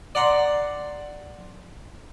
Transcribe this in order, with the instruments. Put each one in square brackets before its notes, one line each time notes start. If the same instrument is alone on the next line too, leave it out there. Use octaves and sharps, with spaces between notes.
[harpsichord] D5 F#5 A#5 C6